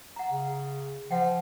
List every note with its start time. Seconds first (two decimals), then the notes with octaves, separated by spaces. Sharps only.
0.16 F#5 A#5
0.31 C#3
1.11 F3 F#5 G5